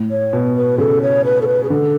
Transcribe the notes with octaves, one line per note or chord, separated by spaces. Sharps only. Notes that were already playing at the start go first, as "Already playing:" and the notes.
Already playing: A2
C#5
B2
B4
C#3 A4
C#5
B4
A4
B4
G#4
D3 A4